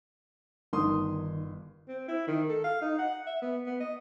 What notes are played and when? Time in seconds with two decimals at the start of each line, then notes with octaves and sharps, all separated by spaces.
0.73 G1 D#3 C6 D#6
1.88 C4
2.08 E4
2.28 D#3
2.49 A4
2.64 F5
2.82 D#4
2.99 F#5
3.26 E5
3.42 B3
3.67 B3
3.80 D#5